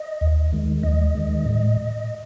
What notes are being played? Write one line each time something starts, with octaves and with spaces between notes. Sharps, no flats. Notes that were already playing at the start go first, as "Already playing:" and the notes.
Already playing: D#5
D#2
D#3 G#3
D#2 D#5
D#3 G#3
A2